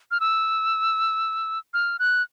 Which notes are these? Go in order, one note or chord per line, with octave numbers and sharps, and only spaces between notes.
F6
E6
F6
F#6